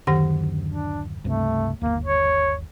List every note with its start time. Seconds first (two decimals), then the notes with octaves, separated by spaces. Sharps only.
0.07 D1 F#2 D3 D#3 G4 F#5
0.67 D4
1.25 C#2 G2 C3 A3
1.82 G1 D#2 A#3
2.05 C#5